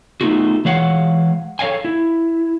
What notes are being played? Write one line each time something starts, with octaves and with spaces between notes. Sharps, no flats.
A3 B3 D#4 F4 F#4
E3 G#3 C#5 F5 F#5
A4 C#5 D#5 F5 G#5
E4